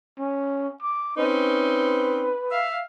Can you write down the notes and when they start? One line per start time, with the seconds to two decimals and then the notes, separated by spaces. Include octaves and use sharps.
0.19 C#4
0.83 D6
1.17 C4 C#4 D#4 B4
2.51 E5 F5